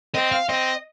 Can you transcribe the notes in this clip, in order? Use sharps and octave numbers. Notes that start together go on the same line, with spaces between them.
C4 D#5
F5
C4 D#5